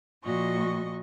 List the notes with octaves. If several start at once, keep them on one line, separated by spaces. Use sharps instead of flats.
A#2 F3 F#4 D#5 C#6